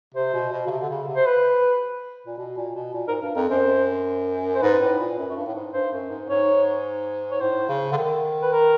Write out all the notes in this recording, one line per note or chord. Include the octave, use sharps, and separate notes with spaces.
C3 C5
B2
B2
C#3
C3
D3
C#3
C3
C5
B4
A#2
B2
A#2
B2
A#2
G#2 A#4
G2
F2 A#4
F#2 C5
C5
G#2 B4
A2
A#2
F#2
F#2
G2
A2
G#2
G2 C5
F#2
G#2
G#2 C#5
C#5
A2 C5
C#3
D3
D#3
B4
A#4